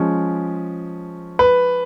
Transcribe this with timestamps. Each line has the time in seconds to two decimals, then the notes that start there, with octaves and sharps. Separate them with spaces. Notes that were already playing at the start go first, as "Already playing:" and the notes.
Already playing: F3 G#3 C#4
1.39 B4